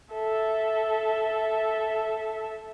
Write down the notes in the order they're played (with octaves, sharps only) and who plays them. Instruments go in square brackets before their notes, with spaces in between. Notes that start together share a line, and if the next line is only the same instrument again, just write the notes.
[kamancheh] A4 E5